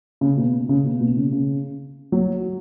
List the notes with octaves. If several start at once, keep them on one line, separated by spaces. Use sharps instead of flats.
C#3
B2
C#3
B2
B2
C#3
C#3
F#3